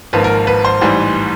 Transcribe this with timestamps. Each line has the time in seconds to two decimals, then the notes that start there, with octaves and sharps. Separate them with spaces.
0.13 G#1 G#2 F3 A#3 B4
0.24 A#4
0.47 B4
0.65 C5
0.81 A1 G#2 E3 G3